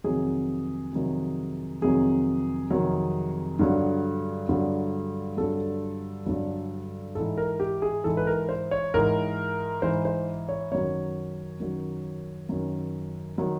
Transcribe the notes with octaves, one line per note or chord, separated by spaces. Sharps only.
F2 C3 D#3 F#3 G#4
F2 C3 D#3 F#3
F2 C3 D#3 F#3 G#4
F2 C3 D#3 F#3
G2 D3 F#3
G2 D3 F#3
G2 D3 F#3 A4
G2 D3 F#3
G#2 E3 A4
A#4
G4
G#4
G#2 E3 A4
B4
A#4
C5
C#5
G#2 E3 A#4
G#2 E3 C5
C5
C#5
F#2 D#3 F#3 C#5
F#2 D#3 F#3
F#2 D#3 F#3
D#3 F#3